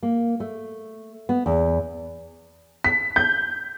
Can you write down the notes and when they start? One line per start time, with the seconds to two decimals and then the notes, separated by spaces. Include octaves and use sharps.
0.03 A#3
0.40 A3
1.29 B3
1.46 E2
2.84 B6
3.16 G6